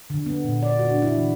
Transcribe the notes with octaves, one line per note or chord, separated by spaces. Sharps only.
D3
B3
A#2
D5
F#4
D4
E4
E3